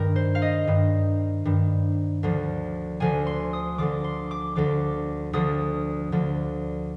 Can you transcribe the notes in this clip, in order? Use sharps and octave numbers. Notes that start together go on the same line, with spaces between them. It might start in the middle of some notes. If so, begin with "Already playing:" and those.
Already playing: G2 D#3 A#4
C5
F5
D#5
G2 D#3
G2 D#3
D2 D3 F3
D2 D3 F3 G#5
C6
D#6
D2 D3 F3 D6
C6
D6
D2 D3 F3 D6
D2 D3 F3 D#6
D2 D3 F3